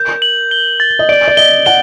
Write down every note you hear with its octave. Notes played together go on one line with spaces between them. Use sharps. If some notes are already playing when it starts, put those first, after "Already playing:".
Already playing: A#4 G6
F#7
G7
A6
D#5
D5 D7
D5
D#5 G7
F#5 G7